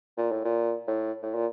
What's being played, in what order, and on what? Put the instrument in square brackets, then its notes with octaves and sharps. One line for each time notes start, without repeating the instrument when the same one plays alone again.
[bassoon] A#2
A2
A#2
A2
A2
A#2